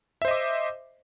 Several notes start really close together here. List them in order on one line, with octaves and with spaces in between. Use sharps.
E5 C5 D#5 D6